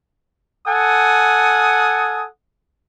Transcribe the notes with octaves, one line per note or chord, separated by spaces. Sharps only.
A4 F#5 G#5 D#6